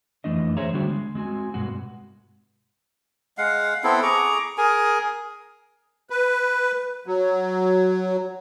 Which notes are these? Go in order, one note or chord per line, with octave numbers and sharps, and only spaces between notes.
F2 E3 A3 D4 D#5
G#4 C5 C#5 E5 A#5
D3 G3 D4 F#4
G#3
G#3 C4 F#4 G#5
G2 B2 G#3 F#4
G#3 F5 F#5
B3 C4 E4 A4
G#4 A#5 C#6 D6
G#4 A#4 G#5
B4
F#3